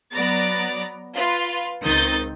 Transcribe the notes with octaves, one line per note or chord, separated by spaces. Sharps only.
F#3 B3 D5 A#5 A6
F4 B4
C#2 D#3 C4 D#6 G6 A6